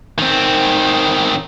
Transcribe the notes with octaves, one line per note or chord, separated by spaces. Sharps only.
D#3 C4